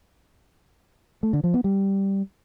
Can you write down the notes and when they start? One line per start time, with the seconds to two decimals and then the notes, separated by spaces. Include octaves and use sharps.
1.23 A3
1.33 D3
1.44 F3
1.54 B3
1.64 G3